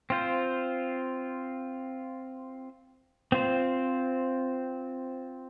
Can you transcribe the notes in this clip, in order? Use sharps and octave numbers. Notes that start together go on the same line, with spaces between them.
C4 F4 C5
C4 F4 C5